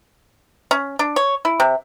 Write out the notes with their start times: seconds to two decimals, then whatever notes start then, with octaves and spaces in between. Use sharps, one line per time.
0.71 C#4
0.99 D4
1.16 C#5
1.45 E4
1.60 C3